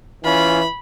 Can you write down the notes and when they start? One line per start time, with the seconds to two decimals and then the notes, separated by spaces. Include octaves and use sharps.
0.24 E3 C#4 F4 B5